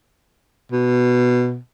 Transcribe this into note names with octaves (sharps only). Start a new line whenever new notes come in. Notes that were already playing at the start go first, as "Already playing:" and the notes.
B2